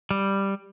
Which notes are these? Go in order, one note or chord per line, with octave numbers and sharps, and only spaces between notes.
G3